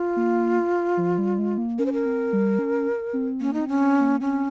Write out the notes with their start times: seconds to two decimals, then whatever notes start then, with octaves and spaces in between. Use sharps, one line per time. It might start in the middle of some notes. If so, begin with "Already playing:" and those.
Already playing: F4
0.16 A#3
0.97 F3
1.18 G3
1.39 G#3
1.58 A#3
1.78 C#4 A#4
1.86 C5
1.93 A#4
2.06 C4
2.33 G3
2.59 C#4
3.13 C4
3.41 A#3 C#4
3.53 D#4
3.60 C4
3.68 C#4
3.80 C4
4.01 A#3
4.21 C4 C#4